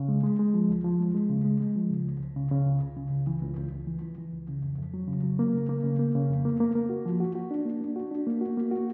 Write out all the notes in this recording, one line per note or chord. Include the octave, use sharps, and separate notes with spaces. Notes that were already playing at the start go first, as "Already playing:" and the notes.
Already playing: C#3
G#3
G#3
G#3
F3
D2
F3
G#3
G#3
C#3
G#3
G#3
F3
C#3
C#2
C#2
C#3
C#3
C#2
C#2
C#3
C#2
E3
C#2
C#2
C#2
E3
E3
E3
C#2
C#3
F2
F2
F#3
C#3
F#3
A#3
C#3
A#3
C#3
A#3
C#3
F2
A#3
A#3
A#3
F#4
F3
F#4
F#4
D4
A#3
D4
F#4
D4
A#3
F#4
A#3
F#4